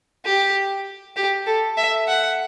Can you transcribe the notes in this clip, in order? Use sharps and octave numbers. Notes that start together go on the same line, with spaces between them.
G4
G4
A4
E5
F#5